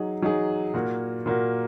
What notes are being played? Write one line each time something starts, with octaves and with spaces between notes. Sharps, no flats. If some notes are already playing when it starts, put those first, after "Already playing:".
Already playing: F#3 D#4 G#4
F#3 D#4 G#4
A#2 A#3 F#4
A#2 A#3 F#4